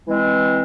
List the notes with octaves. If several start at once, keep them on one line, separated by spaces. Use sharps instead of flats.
E3 G#3 C4